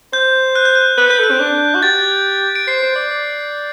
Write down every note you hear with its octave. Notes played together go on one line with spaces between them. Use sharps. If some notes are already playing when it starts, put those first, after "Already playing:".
C5 G6
F#6
G6
F#6
B4 F#6
B4 G6
A4
F#6
C4
D4
F#4
G4 A6
D7
C5 C7
C5
D5
D5